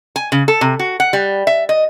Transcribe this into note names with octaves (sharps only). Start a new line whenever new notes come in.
G#5
C#3
A4
C3
F#4
F#5
G3
E5
D#5